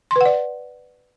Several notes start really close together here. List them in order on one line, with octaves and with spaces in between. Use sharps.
C6 B4 F#5 D5